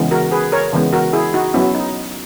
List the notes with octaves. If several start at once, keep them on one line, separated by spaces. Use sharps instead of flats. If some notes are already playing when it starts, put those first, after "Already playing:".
Already playing: C#3 E3 G#3 B3
F#4 A#4
G#4 B4
A#4 C#5
C#3 E3 G#3 B3
F#4 A#4
E4 G#4
D#4 F#4
F#3 B3 C#4 E4
D#4